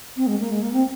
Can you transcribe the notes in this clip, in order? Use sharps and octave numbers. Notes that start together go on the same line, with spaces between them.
C4
G#3
A#3
G#3
A#3
C4